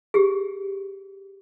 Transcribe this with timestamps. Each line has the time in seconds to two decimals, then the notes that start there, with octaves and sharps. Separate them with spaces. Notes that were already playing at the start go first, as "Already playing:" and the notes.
0.14 G4 G#4